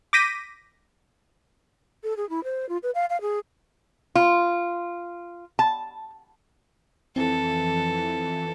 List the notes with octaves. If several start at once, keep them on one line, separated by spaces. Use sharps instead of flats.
D6 G6 A#6 B6 D#7
A4
G#4
E4
C5
F4
B4
F5
F5
G#4
F4
A5
F2 E3 C4 A4